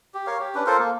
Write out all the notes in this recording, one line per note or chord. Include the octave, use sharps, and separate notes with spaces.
G4
A#4 C#5 F5
G4
C#4 D4 B4
F4 A4 A#4 C5
A#3